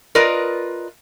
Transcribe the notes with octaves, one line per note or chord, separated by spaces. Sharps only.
F4 A#4 B4 D5 D#5